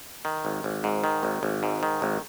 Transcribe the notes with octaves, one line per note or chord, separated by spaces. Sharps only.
D#3
G#1
G#1
G#2
D#3
G#1
G#1
G#2
D#3
G#1